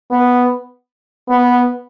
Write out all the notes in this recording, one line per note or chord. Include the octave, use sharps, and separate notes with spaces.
B3
B3